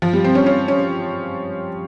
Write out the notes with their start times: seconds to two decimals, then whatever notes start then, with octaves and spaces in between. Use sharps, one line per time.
0.02 F3
0.13 G3
0.24 C4
0.35 C#4
0.46 C#4
0.68 C#4